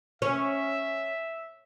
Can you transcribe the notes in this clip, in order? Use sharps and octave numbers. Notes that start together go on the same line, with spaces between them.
C#4 E5